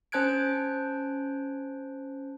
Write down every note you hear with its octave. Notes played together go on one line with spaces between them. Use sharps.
C#4 C5 A5 F#6 G#6 D7